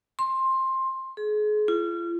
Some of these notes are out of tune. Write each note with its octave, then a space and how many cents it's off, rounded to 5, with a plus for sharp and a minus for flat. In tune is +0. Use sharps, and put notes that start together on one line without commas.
C6 +15
G#4 +35
F4 -35